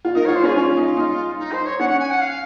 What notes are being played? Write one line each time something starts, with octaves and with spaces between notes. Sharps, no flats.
F4
D#4 A#4
F4 C#5
C5
C#4
G#4
C#4 F4
D#4
D#4
D#4
C5
C#5
C#4 F#5
F#5
G#5
F#5
F5